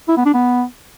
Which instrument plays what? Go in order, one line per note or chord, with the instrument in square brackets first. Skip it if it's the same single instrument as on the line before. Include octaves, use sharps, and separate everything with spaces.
[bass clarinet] E4
B3
D4
B3